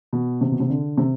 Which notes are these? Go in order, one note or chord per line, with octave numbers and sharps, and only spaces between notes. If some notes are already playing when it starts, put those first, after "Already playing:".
B2
C3
B2
C3
D3
C3